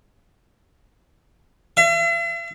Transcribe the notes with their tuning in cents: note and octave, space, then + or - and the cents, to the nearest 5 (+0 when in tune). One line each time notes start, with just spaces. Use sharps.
E5 +45